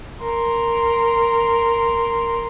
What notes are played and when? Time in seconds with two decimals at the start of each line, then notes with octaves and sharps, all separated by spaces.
0.22 A#4 C6